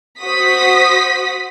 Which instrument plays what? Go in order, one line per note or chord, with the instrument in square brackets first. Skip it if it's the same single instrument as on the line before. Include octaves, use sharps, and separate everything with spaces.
[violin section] F#4 C5 D#6 B6